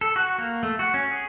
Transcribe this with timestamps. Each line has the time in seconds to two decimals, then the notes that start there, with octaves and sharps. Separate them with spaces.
0.01 A4
0.16 F#4
0.38 A#3
0.63 A3
0.79 F#4
0.94 C#4
1.12 G#4